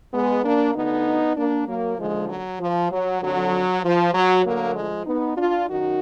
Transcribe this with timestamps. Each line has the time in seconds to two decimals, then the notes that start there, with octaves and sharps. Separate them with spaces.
0.13 G#3 B3
0.44 A#3 D4
0.75 D2 D3 B3 D#4
1.36 A#3 D4
1.67 F#3 A#3
1.98 D#2 D3 F3 G#3
2.29 F#3
2.60 F3
2.91 F#3
3.22 F2 D3 F#3
3.83 F3
4.14 F#3
4.45 D2 D3 F#3 A#3
4.76 F3 G#3
5.06 B3 D#4
5.37 D4 F4
5.68 F#2 D#3 D#4 F#4